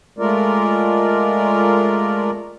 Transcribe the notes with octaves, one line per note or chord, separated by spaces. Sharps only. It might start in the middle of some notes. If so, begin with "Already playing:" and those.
G#3 A3 F4 A#4 D5